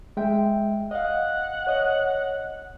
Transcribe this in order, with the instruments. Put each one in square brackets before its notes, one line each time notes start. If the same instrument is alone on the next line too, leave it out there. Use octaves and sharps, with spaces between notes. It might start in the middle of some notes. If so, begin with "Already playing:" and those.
[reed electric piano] G#3 E5 G5
[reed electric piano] D#5 F5 [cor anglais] F#5
[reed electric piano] C#5 D#5